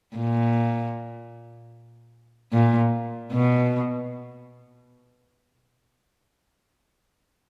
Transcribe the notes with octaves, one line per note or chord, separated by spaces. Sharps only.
A#2
A#2
B2